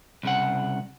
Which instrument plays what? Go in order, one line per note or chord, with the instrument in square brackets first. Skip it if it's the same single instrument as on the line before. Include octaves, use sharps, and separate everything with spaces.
[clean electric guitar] C2 C#3 F#5